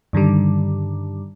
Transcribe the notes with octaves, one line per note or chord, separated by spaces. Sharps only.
G2 D3 D#3 G3